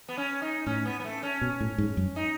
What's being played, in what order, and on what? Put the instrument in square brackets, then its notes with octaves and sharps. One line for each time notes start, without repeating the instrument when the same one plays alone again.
[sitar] B3
C#4
D#4
[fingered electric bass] A2 [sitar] C#4
[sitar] B3
B3
A3
C#4
[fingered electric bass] B2
A2
G#2
F#2
[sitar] D#4